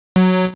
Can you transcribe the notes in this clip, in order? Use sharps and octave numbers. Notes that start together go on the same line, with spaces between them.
F#3